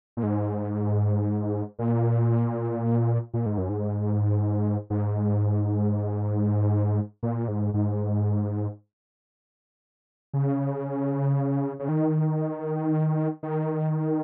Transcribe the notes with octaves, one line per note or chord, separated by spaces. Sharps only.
A#2
G#2
A#2
A#2
G#2
F#2
G#2
G#2
A#2
G#2
G#2
C#3
C#3
D#3
D#3